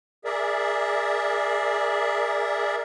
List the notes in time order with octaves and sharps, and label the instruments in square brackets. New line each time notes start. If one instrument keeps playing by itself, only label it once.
[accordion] G#4 A#4 D5 E5